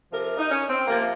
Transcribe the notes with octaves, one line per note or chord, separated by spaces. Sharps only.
C3 F3 A#4
A#4
D#4
C#4
C4
C3 F3 A#3